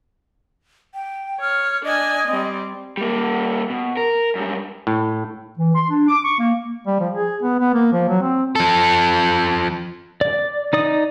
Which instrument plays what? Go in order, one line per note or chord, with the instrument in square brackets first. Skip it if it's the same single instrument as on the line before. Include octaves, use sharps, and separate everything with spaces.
[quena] G5
[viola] C#5 [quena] F6
[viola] D4 G#5 [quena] D#5
[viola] G3 C4
[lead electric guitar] G3 A#3
B2
A#4
F#2 G3
[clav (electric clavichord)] A2
[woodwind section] E3
C6
D4
D6
C#6
A#3
[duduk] G3
F3
G#4
B3
B3
A#3
F3
F#3
C4
[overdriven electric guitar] F3 A4
[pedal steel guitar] D5
D#4 D5 D#6